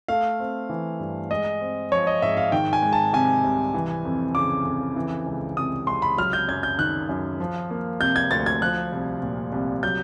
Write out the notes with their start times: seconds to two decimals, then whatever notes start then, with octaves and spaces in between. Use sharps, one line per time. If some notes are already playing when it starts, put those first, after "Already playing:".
0.08 A3 F5
0.40 C4
0.70 E3
1.00 G2
1.31 G#3 D#5
1.61 C4
1.92 F3 C#5
2.07 D#5
2.22 G#2 E5
2.37 F5
2.52 D#3 G5
2.73 G#5
2.82 G#3
2.93 A5
3.13 C3 G#5
3.44 C2
3.74 E3
4.05 F2
4.35 C#3 D6
4.65 F2
4.96 E3
5.26 C#2
5.57 C3 D#6
5.87 C#2 C6
6.02 B5
6.18 F#3 F6
6.33 G6
6.48 F#2 G#6
6.63 G6
6.78 D#3 F#6
7.09 F#2
7.40 F3
7.70 A#3
8.00 C3 G6
8.16 G#6
8.30 D2 A6
8.46 G#6
8.62 F3 F#6
8.92 C2
9.22 A#2
9.52 C2
9.83 F#3 G6